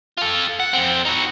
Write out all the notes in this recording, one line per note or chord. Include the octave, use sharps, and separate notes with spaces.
F4 A4
F#5
F2 C4
D#4 F#4